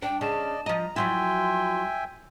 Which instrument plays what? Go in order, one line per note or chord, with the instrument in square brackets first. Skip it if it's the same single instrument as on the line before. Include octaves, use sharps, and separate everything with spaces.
[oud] D4 [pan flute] G5
[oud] C#3 [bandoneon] D5 D#5 [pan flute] A5
[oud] F3 D#5 [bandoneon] A#5
[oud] F3 F#3 E4 [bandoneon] E5 G5 G#5 [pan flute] C6